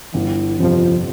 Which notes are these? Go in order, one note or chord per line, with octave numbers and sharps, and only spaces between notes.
G1 E3
F2 C3 F3